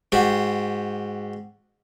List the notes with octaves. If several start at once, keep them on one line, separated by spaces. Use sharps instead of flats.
G#2 F#4 G4